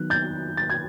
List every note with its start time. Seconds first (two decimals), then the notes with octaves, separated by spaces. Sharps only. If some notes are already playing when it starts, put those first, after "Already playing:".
Already playing: D#3 F#3 B3 F#6
0.10 G6 A6
0.57 A6
0.70 G#6